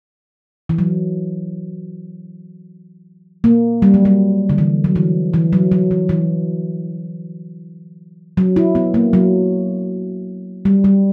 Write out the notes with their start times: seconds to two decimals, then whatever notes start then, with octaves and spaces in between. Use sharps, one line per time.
0.69 E3
0.78 F#3
3.44 A#3
3.82 G3
3.94 F#3
4.05 G3
4.50 D3
4.58 E3
4.84 F#3
4.96 E3
5.34 E3
5.53 F#3
5.72 F#3
5.91 E3
6.09 E3
8.37 F#3
8.56 E4
8.75 B3
8.94 A#3
9.13 F#3
10.65 G3
10.84 G3